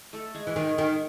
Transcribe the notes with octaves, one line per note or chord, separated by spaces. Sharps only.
A3 A4
G#3 G#4
E3
D#3 G#3 G#4
D#3